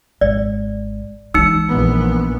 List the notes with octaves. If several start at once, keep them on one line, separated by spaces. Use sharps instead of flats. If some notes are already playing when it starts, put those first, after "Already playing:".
G#1 D5
E3 G#3 D#4 E6 C#7
A#1 B3